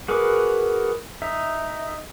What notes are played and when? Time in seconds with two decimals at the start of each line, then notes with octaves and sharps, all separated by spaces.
0.08 F#4 G#4 A#4 B4 D6
1.22 D#4 E5